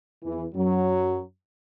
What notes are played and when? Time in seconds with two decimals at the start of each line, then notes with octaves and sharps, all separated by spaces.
0.24 E2 E3
0.54 F#2 F#3